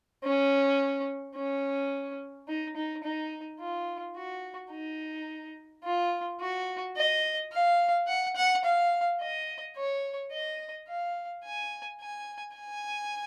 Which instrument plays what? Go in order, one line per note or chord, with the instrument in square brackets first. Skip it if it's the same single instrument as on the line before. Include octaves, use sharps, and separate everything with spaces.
[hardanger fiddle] C#4
C#4
D#4
D#4
D#4
F4
F#4
D#4
F4
F#4
D#5
F5
F#5
F#5
F5
D#5
C#5
D#5
F5
G#5
G#5
G#5